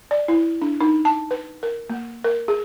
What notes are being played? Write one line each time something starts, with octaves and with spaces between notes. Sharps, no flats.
D5
E4
D4
D#4
A5
B4
A#4
A#3
A#4
G#4